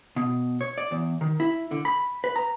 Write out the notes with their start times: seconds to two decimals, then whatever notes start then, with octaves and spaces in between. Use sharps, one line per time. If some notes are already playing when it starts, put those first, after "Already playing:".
0.16 B2
0.61 C#5
0.78 D5
0.91 E2
1.21 D#3
1.40 E4
1.71 D3
1.85 B5
2.24 B4
2.36 A#5